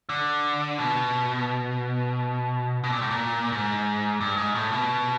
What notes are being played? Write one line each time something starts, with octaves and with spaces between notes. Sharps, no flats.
D3
B2
B2
A#2
A2
A#2
G#2
G2
G#2
A2
B2